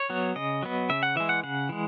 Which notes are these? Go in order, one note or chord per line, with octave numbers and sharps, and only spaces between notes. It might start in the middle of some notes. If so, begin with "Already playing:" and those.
Already playing: C#5
F#3 B3
C#3 D#5
F#3 B3
C#3 E5
F#5
E3 G#3 E5
F#5
C#3 F#5
E3 G#3